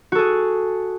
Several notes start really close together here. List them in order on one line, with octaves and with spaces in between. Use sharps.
F#4 A4 G#4